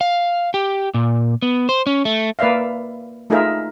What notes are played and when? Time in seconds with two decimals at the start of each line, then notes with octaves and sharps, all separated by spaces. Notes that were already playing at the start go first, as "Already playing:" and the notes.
0.01 F5
0.54 G4
0.94 A#2
1.42 B3
1.69 C5
1.87 C#4
2.05 A3
2.39 A#3 B4 D5 E5 F5
3.30 A3 D#4 F4 G#4 A#4 E5